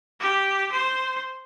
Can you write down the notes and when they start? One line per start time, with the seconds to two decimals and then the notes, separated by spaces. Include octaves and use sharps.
0.20 G4
0.72 C5